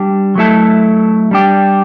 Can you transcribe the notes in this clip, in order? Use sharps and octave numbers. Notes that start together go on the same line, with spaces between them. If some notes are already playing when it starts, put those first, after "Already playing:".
Already playing: G3 D4 G4
F#3 A3 E4 A4
G3 D4 G4